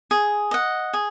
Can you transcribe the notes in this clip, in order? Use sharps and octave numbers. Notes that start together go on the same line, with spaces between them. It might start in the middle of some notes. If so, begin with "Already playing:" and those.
G#4
D#5 F#5
G#4